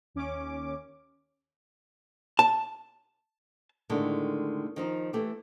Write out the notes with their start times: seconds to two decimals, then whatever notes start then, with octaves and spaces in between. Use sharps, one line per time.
0.15 D#2 C#4 D6
2.39 A5
3.90 A2 D3 D#3 G#3 A3
4.76 D#3 F3 D#4
5.13 E3 A3 G4